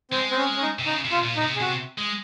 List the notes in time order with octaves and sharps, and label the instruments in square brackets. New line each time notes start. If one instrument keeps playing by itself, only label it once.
[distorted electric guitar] G#3 [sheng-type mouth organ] C4
[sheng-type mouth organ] C4
C#4
C#4
D#4
[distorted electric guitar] C3
[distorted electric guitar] C#3 [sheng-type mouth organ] D#4
[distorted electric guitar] C3
[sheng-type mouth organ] F4
[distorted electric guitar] A#2
[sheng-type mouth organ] D#4
[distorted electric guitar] C3
[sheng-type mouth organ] G#4
[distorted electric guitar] C3 [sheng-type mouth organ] F#4
[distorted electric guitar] G#3